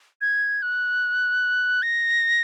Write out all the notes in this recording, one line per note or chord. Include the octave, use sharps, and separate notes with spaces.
G#6
F#6
A#6